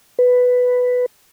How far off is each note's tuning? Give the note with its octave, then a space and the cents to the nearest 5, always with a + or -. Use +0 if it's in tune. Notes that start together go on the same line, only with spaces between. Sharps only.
B4 +5